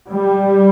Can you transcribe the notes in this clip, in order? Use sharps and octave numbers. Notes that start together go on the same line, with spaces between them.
G3